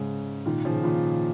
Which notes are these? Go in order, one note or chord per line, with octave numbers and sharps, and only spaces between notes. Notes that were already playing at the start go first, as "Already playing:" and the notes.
Already playing: G#2 C#3
A#2 D#3
C#3 F3
A#2 D#3